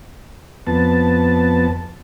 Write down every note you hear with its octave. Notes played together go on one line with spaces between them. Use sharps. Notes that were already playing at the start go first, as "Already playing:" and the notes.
F2 B3 A5